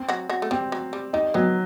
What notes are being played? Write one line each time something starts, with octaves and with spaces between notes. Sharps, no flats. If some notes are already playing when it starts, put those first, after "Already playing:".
Already playing: C4
F#3 F#4
F#3 F#4
A3
G3 C4
F#3
G3
G3 D#4
F#3 B3